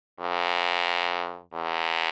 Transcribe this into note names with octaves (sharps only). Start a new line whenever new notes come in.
F2
E2